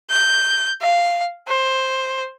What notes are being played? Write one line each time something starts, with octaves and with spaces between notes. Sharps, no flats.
G6
F5
C5